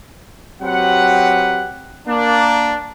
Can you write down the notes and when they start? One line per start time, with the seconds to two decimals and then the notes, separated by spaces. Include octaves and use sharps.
0.63 F#3 C4 G4 B4 F#5
2.08 A#3 D4